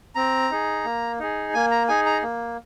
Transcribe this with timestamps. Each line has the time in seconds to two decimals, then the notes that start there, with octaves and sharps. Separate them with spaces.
0.15 C4 A#5
0.51 D#4 G#4
0.84 A#3
1.19 D#4 G#4
1.54 A#3 G#5
1.71 A#5
1.88 D#4 G#4 G#5
2.06 A#5
2.23 A#3